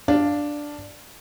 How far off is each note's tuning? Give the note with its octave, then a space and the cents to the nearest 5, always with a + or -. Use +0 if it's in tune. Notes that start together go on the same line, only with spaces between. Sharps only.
D4 +0 F5 +0